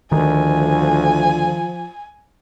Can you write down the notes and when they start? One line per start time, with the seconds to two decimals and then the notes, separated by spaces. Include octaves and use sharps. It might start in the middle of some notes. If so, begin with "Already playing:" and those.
0.12 D2 D#3 F3 G#5